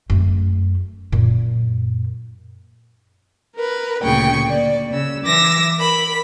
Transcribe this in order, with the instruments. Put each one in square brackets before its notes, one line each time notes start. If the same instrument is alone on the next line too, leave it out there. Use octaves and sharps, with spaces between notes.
[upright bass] F#2 A3
F#2 A#2
[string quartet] A#4 B4
D2 A#2 C#3 G#4 G5 C#6
A#3 D5
C#3 E6
E3 D6 E6 A#6
A#4 B5